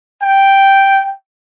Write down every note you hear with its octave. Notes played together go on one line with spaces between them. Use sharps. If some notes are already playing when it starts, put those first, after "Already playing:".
G5